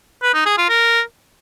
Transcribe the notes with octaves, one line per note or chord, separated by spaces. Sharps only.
B4
D#4
G#4
F4
A#4